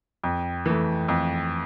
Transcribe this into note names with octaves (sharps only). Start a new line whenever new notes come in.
F2
E3 A3
F2